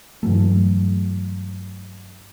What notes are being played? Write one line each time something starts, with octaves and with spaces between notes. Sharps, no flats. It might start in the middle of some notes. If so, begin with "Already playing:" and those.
G2 E3 F#3 A3